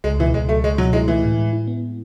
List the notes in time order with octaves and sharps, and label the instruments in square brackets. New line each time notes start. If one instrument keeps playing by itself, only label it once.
[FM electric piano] C#2 [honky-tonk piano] G#3
[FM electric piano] B2 [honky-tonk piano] E3
[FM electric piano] C#2 [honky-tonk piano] G#3
[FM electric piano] F#3 [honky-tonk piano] A3
[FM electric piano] C#2 [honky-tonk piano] G#3
[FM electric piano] B2 [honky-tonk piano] F#3
[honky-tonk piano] G#3 [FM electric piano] E4
[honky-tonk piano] E3 [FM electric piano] A3
[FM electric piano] A2
G#3
E4
B3